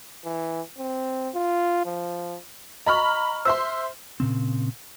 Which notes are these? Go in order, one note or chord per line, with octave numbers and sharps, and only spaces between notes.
E3
C4
F4
F3
D#5 A#5 B5 C#6 F6
C5 E5 C6 E6
A#2 C#3 C4